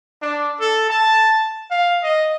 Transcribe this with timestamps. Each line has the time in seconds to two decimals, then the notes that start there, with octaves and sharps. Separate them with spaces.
0.22 D4
0.60 A4
0.90 A5
1.71 F5
2.03 D#5